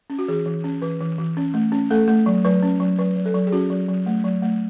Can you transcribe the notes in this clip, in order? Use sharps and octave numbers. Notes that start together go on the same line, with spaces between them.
C#4
F#4
E3 G#4
E3
C#4
E3 B4
E3
E3
C#4
A3
C#4
A3 A4
A3
F#3
F#3 B4
C#4
F#3
F#3 B4
F#3
A4
F#3
G#4
C#4 F#4
F#3
F#3
A3
F#3
A3